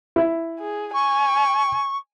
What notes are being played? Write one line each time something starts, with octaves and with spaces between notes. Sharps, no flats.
E4
G#4
G#5 C#6